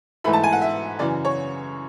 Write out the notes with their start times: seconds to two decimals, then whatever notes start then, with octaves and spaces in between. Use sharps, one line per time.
0.24 G#2 E3 A3 E4 B5
0.33 A5
0.43 G#5
0.53 F#5
0.61 E5
0.99 F#2 C#3 E3 D5
1.25 C#5